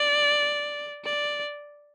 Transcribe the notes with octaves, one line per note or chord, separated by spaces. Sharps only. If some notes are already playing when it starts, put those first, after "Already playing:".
Already playing: D5
D5